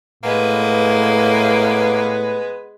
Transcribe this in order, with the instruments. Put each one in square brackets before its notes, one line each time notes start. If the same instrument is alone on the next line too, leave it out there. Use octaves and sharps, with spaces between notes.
[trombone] A2 [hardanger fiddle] G#3 B4 [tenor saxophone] A#3 [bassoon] B3